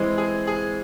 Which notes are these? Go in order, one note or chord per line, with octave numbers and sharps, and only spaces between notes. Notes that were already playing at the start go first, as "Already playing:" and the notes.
Already playing: E3 G#3 C4
G#4
G#4